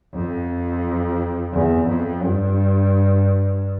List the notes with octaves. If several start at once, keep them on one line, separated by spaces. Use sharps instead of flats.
F2
E2
F2
G2